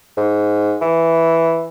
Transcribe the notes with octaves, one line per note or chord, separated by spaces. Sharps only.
G#2
E3